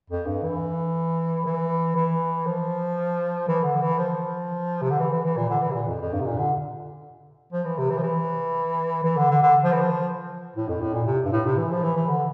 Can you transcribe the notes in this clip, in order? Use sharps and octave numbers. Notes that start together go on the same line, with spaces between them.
F2
G2
E3
E3
E3
F3
E3
D3
E3
F3
C3
D3
E3
E3
E3
A#2
D3
E3
C3
A#2
F2
F2
G2
C3
A#2
D3
F3
E3
C3
E3
F3
E3
E3
D3
D3
D3
F3
E3
F3
A2
F2
A2
A#2
C3
G2
A2
C3
E3
F3
E3
E3
D3